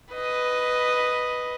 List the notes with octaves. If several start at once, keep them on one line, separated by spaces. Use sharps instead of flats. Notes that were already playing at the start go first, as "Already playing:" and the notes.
B4 D#5